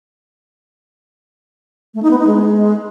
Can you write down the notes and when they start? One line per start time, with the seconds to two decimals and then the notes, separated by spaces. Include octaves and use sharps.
1.94 A3
2.03 D#4
2.11 B3
2.19 D#4
2.27 G#3